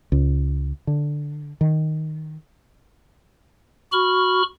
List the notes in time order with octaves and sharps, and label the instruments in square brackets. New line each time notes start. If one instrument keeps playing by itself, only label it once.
[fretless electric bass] C#2
D3
D#3
[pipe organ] F#4 B5 C#6 F6